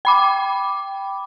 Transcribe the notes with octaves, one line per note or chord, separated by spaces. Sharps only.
G5 B5 D6